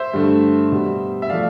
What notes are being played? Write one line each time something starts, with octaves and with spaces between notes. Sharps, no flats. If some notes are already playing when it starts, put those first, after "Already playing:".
Already playing: C5 E5
G2 D3 A3
B2 G3
E5
F3 A3 D5 F5